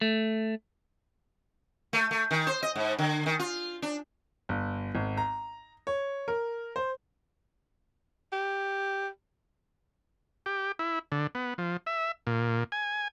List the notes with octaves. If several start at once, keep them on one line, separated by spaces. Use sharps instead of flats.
A3
A3
A3
D#3
C5
D#5
G#2
D3
D#3
F4
D4
G1
G#1
A#5
C#5
A#4
C5
G4
G4
E4
D3
B3
F3
E5
A#2
G#5